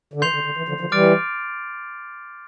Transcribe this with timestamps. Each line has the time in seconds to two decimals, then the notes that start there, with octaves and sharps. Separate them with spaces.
0.14 D3
0.22 E3 C6 G6 C7 F7
0.34 D3
0.45 D3
0.57 E3
0.69 D3 F3
0.80 D3 F3
0.92 E3 G3 D6 F6 A6 D7